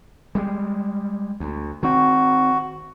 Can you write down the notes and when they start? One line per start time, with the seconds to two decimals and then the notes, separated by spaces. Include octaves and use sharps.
0.35 G3 G#3
1.40 D2
1.83 D#3 C4 F#4